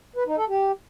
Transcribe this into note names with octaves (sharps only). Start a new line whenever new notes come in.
B4
D#4
A4
G4